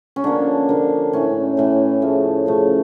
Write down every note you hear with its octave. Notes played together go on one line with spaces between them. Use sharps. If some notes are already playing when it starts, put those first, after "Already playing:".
C#4
D3 F3 A#3 D4
D3 F3 A#3
A2 E3 A3 C#4
A2 E3 A3
C#3 F3 A3
C#3 F3 A3